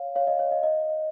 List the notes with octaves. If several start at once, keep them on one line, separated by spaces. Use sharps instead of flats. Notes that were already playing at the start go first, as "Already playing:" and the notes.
Already playing: C#5 F5
C#5 F5
D#5
C#5
D#5
D#5